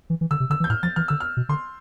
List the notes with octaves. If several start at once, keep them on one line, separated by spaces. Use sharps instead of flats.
E3
E3
D3 E6
C3
D3 E6
E3
G6
A2 F6
F3 A6
E3 F6
D3 E6
F6
B2
D3 C6